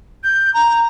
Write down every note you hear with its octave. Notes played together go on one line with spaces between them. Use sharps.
G6
A#5